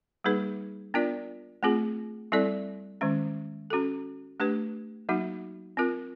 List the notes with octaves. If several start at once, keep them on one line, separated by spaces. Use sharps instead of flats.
G3 A#3 D#4 G#4 B4
B3 D4 F4 A#4 D5
A3 C4 F4 G#4
G3 C4 E4 A4 D5
D#3 G#3 C#4
C#4 F#4 A4
A3 D4 G4 B4
F#3 A#3 D#4 F#4
C4 F4 A#4